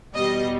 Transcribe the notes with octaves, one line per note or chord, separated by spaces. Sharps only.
E2 B2 G3 D#5